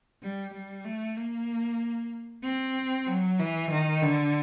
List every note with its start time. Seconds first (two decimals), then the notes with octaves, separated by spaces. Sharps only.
0.23 G3
0.54 G3
0.85 A3
1.16 A#3
2.44 C4
3.07 F#3
3.39 E3
3.71 D#3
4.02 D3